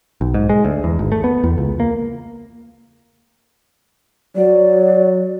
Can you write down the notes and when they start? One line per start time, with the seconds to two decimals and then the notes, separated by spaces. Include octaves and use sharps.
0.21 B1
0.34 G#2
0.49 G#3
0.65 D2
0.84 E2
0.99 G#1
1.12 A3
1.24 B3
1.44 E2
1.58 C#2
1.80 A#3
4.36 F#3 D5